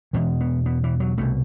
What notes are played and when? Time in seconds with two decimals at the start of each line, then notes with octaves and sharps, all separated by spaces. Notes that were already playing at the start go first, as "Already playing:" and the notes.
0.13 E2 B2 E3
0.41 B3
0.66 B3
0.84 E3
1.00 F#3
1.18 C2 B2 A3